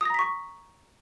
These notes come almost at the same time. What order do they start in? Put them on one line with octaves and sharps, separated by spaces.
D#6 A#6 A#5 B6 C#6